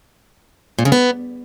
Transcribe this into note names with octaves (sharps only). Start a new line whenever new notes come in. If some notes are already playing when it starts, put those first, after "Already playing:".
A#2
C#3
B3